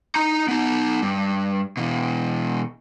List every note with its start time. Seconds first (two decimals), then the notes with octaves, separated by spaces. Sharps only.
0.15 D#4 A#5
0.48 B3 D#4
1.02 G2
1.77 B2 E3